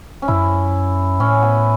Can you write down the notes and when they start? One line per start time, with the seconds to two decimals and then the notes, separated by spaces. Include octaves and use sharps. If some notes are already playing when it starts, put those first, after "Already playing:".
0.22 C#4
0.28 F#2 E4
1.20 A2 C#4
1.43 B3